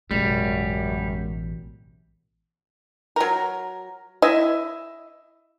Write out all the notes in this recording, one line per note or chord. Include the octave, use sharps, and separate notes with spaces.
A1 F#2 B2 G3 G#3
F#3 A#4
E4 D#5 E5